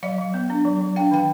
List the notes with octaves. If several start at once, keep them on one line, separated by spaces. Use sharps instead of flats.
F#3 D#5 F5
F#3
B3
D4
F#3
F#3
D4 F5 G5
D#3 G5